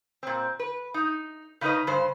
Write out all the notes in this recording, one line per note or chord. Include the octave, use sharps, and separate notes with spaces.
A#2 C4
B4
D#4
C#3 C#4 D#4 A#4 B4 D#5
G2 C#3 C5